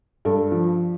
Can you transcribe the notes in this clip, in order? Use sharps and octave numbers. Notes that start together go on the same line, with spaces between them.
G2 A4
F3